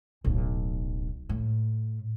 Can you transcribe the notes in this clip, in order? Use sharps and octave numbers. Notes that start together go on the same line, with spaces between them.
D1 B1
A2